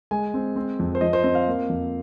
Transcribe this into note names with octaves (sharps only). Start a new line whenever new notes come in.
G#3 G#5
C4
C4
F2
C5
F3 D#5
C5
C4 D#5
F5
A#3
F2